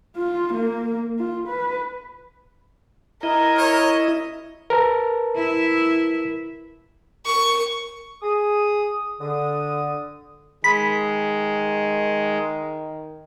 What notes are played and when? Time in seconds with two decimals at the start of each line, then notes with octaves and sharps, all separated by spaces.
0.17 F4
0.53 A#3
1.19 F4
1.48 B4
3.23 E4 A#4 D#5
3.58 C#5
4.70 A#4 B4 A5
5.35 E4 E5
7.26 A#4 C#6
8.22 G#4 D#6
9.20 D3 D#6
10.64 D#3 G#3 B5